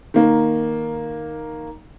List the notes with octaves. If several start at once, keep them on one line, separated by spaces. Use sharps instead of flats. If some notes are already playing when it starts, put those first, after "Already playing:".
D#3 A#3